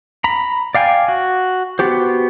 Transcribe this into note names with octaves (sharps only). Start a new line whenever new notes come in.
A#5 B5
D5 F5 G5 G#5
F#4
B3 F#4 G4 C5